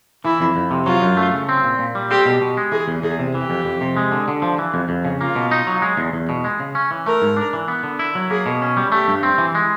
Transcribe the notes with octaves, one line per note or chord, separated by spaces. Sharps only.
E3 E4
F2
F2
C3
F#3 F4
F#2
A3
C#3
C4
A#2
A#2
G3
C4 G4
B2
B2
G#3
E3 G#4
E2
E2 G#4
C3
E3 G4
F2
F2
C3
G#3
D3
D3
F3
E3
F2
F2
C#3
A#3 F4
B2
D#4
F#3
G#3
E2
E2
B2
G#3
C#3
C#4
E3
A3 A#4
G#2
D4
E3
B3
D3
E4
F#3
A#3 G#4
B2
C#4
G3
A3 G4
G2
C4
E3
G#3